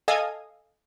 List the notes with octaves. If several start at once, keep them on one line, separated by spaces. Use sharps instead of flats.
A4 D#5 F5 G#5 D#6